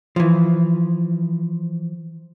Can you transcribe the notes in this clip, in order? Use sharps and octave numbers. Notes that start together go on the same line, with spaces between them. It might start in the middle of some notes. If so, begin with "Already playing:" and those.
E3 F3